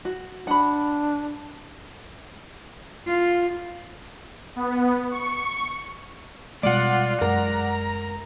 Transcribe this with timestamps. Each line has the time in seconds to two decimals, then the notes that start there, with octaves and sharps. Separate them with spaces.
0.05 F#4
0.47 D4 F#5 B5
3.07 F4
4.56 B3
5.11 C#6
6.63 B2 G3 G#3 F4 D5 F#5
7.21 F#2 G#3 A#4 A#5